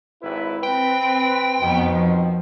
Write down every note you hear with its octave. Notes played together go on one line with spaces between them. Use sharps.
G#1 E4 B4
C4 B4 G5
F2 B2 D#3 B3 C4
F3